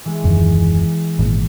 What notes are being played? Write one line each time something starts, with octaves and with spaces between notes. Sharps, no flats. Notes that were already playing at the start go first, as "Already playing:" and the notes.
E3 G#3
D#1 F#2 D#3
G#1 A#2